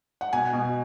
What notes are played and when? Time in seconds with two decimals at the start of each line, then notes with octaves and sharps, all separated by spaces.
0.21 F#5
0.33 B2 G#5
0.53 B2